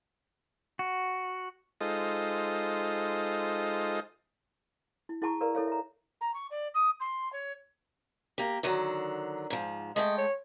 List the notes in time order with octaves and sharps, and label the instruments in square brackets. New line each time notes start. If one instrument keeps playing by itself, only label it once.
[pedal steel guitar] F#4
[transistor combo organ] G#3 D#4 F4 A4 C5 D#5
[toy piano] E4
E4 G#4 F#5 A5 A#5 C#6
A#4 B4 D5 F5 A#5
E4 A4 C#5 F5
E5 A#5
[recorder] A#5
C#6
D5
D#6
C6
C#5
[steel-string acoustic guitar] A#3 G4
D3 D#3 F#3
G#2 F3
[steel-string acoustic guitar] G#3 A3 G5 [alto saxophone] D#5
[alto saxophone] C#5